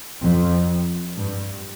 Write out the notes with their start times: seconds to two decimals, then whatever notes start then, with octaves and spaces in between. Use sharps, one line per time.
0.22 F2
1.18 G2